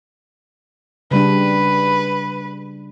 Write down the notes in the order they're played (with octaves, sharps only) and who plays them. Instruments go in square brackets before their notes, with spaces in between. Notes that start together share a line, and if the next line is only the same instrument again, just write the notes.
[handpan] C#3 G3 D4 [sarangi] B4